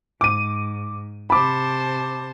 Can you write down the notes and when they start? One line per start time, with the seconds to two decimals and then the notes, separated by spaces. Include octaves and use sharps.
0.21 G#2 D6 D#7
1.30 C3 C5 A5 B5 D6